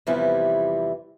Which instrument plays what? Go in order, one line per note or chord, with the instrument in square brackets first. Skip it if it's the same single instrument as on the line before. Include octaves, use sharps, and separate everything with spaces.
[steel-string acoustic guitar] E2 C3 E3 F3 G3 E4